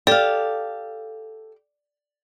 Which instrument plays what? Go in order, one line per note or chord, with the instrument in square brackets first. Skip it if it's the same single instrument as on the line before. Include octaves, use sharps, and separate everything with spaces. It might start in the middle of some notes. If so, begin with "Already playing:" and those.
[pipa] G4 [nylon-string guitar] A4 F5 [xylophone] D5